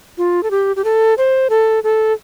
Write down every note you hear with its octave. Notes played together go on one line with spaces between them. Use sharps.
F4
A4
G4
G4
A4
C5
A4
A4